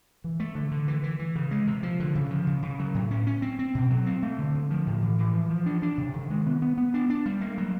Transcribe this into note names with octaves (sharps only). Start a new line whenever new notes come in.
E3
A3
D3
D3
E3
E3
E3
C#3
G#3
C3
F3
D3
C#3
F3
C#3
C#3
F#3
A2
C#4
C#4
C4
C4
B2
F#3
C4
A3
D3
D3
F3
A2
E3
E3
F3
F3
D4
D4
C3
D#3
G#3
B3
B3
B3
D4
D4
G3
A#3
F#3